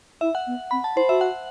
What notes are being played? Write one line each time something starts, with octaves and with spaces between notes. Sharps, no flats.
E4 E5
F#5
B3
C4 B5
A5
E4 C5
F#4 E5
F#5